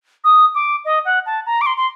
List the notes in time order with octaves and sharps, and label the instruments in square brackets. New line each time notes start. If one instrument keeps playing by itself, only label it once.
[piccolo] D#6
D6
D#5
F#5
A5
A#5
D6
C6
C6